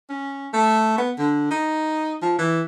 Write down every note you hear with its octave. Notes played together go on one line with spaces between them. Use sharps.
C#4
A3
B3
D3
D#4
F3
E3